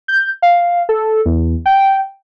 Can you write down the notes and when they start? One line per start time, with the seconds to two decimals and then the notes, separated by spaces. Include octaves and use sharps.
0.08 G6
0.42 F5
0.89 A4
1.26 E2
1.66 G5